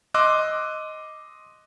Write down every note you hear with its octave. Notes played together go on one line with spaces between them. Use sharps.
D#5 C6 D6 E6 F#6